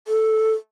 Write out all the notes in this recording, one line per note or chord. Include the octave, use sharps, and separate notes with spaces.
A4